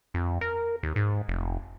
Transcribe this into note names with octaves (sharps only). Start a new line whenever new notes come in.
F2
A#4
D#2
G#2
F1